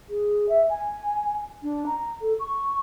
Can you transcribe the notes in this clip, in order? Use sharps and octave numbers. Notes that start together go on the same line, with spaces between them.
G#4
E5
G#5
D4
A#5
A4
C#6